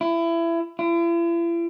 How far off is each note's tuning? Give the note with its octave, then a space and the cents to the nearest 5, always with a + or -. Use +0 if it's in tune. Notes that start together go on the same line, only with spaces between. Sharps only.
E4 +25
E4 +45